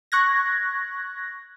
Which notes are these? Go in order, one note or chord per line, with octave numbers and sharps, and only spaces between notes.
C#6 F#6 G#6 A#6